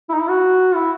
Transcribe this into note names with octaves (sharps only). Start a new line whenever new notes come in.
E4
D#4
E4
F#4
E4